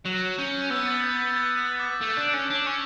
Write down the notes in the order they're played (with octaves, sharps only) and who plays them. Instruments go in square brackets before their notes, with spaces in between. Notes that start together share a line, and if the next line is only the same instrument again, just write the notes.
[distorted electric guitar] F#3 [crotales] F#6
[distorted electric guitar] C#4 [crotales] G6
[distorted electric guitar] B3 [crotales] E6
[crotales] A6
G6
A6
A6
F#6
D6
[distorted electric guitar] A3
D4
C#4
D4
[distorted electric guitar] C#4 [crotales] C#6